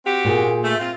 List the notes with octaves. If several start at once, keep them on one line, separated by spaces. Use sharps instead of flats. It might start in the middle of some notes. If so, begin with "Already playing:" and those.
C4 F#4 G4
A#2 A#3 G#4
A3
C4 F4